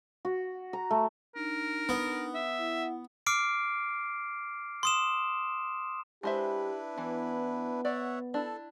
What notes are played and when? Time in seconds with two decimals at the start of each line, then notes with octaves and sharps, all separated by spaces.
0.25 F#4
0.73 A#5
0.91 A3
1.35 D4 D#4 A#4
1.89 B3
2.35 E5
2.58 E4 F#5
3.26 D6 F6 C7 D7
4.83 C6 D#6 E7
6.23 G#3 D4 E4 G4 B4 C5 E5
6.98 E3 B3
7.85 C#5 D5 E5 F#5
8.34 D4 E4 A4